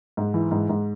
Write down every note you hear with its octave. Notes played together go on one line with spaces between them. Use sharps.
G#2
E3
G#2
G#2